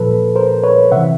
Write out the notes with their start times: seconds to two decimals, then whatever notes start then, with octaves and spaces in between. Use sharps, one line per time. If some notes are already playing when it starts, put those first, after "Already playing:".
Already playing: A#2 F3 A4 B4
0.36 A#4 C5
0.64 B4 C#5
0.92 C3 E5 F#5
0.96 E3